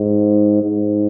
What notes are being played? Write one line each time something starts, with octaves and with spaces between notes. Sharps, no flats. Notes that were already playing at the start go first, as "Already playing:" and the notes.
Already playing: G#2
G#2